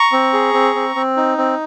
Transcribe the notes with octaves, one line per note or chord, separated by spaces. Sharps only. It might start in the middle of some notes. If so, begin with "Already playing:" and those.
Already playing: A#5 C#6
C4
G#4
C4
C4
C4
D#4
C4